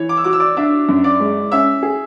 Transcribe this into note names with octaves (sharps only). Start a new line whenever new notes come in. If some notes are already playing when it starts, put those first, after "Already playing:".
Already playing: E3 C#5
D6
E6
F#4 D6
E6
D5 D6
D4 E5 E6
F#2
D5 D6
G#3
C#4 E5 E6
G#4